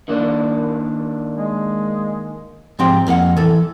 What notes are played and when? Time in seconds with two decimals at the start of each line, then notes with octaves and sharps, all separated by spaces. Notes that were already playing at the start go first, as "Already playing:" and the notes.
0.08 D#3 A#3 D4
1.34 G#3
2.79 G#2 F3 C4 G4 F5 G5
3.07 F2 A#3 G4 F#5
3.37 E3 A4